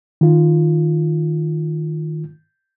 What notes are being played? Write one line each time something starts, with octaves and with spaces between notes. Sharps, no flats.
D#3 F4